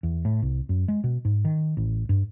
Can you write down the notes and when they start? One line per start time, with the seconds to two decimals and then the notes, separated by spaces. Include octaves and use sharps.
0.03 E2
0.25 A2
0.42 C2
0.69 F#2
0.88 G#3
1.04 B2
1.25 G#2
1.45 D#3
1.77 A1
2.09 G2